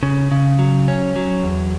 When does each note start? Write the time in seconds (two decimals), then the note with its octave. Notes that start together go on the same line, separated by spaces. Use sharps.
0.03 C#3
0.32 C#3
0.59 F#3
0.88 C#4
1.16 F#3
1.43 E2